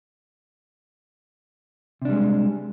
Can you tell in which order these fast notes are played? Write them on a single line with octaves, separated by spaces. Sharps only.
C3 D4 G3 G#3